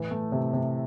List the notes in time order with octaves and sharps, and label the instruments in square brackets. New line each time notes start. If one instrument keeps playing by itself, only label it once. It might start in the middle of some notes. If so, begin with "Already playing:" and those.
Already playing: [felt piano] A2 E3
A3
C3
C3